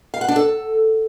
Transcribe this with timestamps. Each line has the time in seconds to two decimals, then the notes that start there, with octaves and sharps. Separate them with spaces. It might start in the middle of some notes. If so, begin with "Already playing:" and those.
0.14 F5
0.21 F#5
0.28 D4
0.36 A4